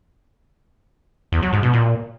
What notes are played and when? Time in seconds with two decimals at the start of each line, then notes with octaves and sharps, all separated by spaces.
1.32 E2
1.42 F#3
1.53 G#2
1.63 B2
1.73 A#2